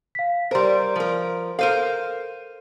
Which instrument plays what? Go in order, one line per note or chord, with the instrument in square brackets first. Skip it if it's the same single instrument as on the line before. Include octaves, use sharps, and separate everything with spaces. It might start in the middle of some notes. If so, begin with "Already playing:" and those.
[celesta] F5 B6
[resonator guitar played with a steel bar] G3 A#4 [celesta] C5 A#5 C6
[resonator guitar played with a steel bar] F3 A#4
[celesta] A4 D#7 [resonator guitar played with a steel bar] A#4 C5 F5